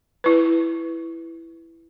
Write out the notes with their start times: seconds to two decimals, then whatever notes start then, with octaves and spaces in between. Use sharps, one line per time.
0.24 E4 B4